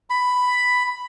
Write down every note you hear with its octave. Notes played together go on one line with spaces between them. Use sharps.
B5